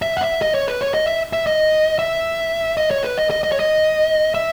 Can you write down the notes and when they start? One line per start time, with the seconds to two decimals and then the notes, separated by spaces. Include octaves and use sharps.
0.02 E5
0.17 F#5
0.22 E5
0.42 D#5
0.54 C#5
0.68 B4
0.81 C#5
0.94 D#5
1.07 E5
1.33 E5
1.47 D#5
1.99 E5
2.77 D#5
2.91 C#5
3.04 B4
3.17 D#5
3.30 D#5
3.43 D#5
3.52 C#5
3.60 D#5
4.34 E5